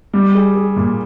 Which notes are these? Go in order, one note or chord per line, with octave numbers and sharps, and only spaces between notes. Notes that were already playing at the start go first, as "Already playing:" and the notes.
G3
G#4
G#4
A#2